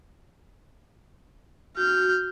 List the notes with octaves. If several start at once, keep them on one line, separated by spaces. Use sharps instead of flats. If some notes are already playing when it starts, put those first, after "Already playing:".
F#4 F6 G6